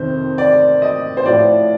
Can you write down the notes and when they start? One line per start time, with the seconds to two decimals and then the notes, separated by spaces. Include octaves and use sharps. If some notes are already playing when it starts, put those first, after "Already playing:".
Already playing: F2 C3 D#3 C5
0.38 D5
0.82 D#5
1.17 C5
1.24 A2 F3 D5